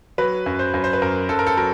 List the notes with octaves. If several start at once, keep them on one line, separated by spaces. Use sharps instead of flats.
F#3 B4
F#2
C5
F#2
C5
B4
F#2 A#4
F#2 A4
A#4
A4
F#3 A#4